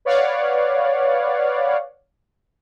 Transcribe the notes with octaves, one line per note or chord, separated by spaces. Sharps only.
B4 C#5 D5 F5 F#5